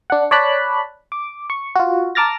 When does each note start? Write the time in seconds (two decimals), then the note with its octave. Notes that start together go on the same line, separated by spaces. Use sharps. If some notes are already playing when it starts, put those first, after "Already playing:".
0.10 D4 F#5
0.31 C#5 D5 A5 B5 F#6
1.12 D6
1.50 C#6
1.76 F4 F#4
2.15 A5 A#5 D6 F6 A6 A#6